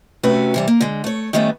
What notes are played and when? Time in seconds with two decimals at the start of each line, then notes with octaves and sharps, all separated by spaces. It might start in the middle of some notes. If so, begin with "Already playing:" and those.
0.23 C3 A3 C#4 F#4 B4
0.54 C3 E3 G3
0.67 A#3
0.81 D3 G#3
1.04 A3 C#5
1.33 D#3 G3 A3 B3 C#4